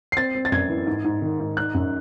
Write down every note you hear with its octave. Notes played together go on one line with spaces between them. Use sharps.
C7
C4 A6
C4
A6
F#2 G#6
E3
G#2
G#2
D#3
G#2
D#4 F#6
F#2